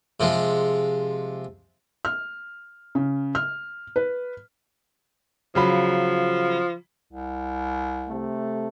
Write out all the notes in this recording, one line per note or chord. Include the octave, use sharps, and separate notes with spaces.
C3 F3 G#3
F6
C#3
F6
B4
C#3 F3 F#3 B5
C2
C3 A3